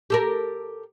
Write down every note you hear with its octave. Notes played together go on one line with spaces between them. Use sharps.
G4 A4 A#4